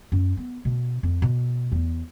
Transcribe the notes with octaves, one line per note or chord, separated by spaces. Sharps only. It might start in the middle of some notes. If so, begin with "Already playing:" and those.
F#2
B3
B2
F2
B2
E2